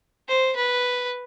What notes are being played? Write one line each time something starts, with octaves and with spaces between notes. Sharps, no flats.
C5
B4